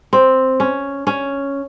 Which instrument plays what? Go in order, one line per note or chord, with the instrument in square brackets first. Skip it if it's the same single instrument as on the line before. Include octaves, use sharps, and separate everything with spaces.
[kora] C4
C#4
C#4